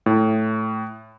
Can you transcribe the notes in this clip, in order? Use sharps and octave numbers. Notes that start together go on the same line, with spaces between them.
A2